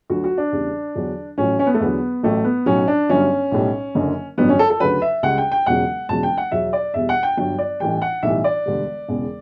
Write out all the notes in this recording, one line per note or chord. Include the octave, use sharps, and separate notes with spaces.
D2 D3 F#3 F#4
F#4
D4
E2 C#3 G3
E2 D3 F#3
A1 A2 F#3 C#4
C#4
B3
A3
E2 D3 F#3 B3
A1 A2 F#3 A3
B3
B1 A2 F#3 C#4
D4
G1 G2 F#3 C#4
B1 A2 G3
F#1 F#2 D3
A1 G2 D3 F#3 B3
C#4
A4
A4
D2 C#3 F#3 B4
E5
C#2 C#3 G3 F#5
G5
G5
E1 E2 C#3 F#3 F#5
E1 E2 C#3 F#3 A5
G5
F#5
E2 B2 F#3 E5
D5
E2 B2 G3 E5
F#5
G5
G1 G2 D3 F#3 G5
D5
A1 A2 E3 G3 G5
F#5
B1 A2 E3 G3 E5
D5
E1 D2 D3 G3
E1 E2 C#3